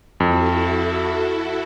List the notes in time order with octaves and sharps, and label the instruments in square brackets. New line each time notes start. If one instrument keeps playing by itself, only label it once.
[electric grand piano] F2 [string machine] E4 F#4 A4